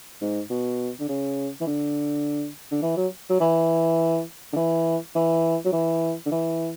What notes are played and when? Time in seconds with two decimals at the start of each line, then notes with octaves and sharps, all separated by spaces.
0.21 G#2
0.50 B2
1.00 D3
1.09 C#3
1.61 E3
1.67 D3
2.71 D3
2.82 E3
2.97 F#3
3.30 F#3
3.40 E3
4.53 D3
4.56 E3
5.16 E3
5.65 F#3
5.73 E3
6.26 D3
6.32 E3